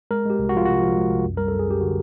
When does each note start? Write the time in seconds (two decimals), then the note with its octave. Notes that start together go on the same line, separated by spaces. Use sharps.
0.11 G#3 A#4
0.26 G#3 G4
0.39 C2
0.49 F#4
0.54 F3 F4
0.65 C3 F#4
0.82 F3
0.96 G#3
1.11 C2
1.25 F#2
1.37 G3 A#4
1.48 F#2 A4
1.59 G#4
1.68 F#2 G4
1.81 D3 F#4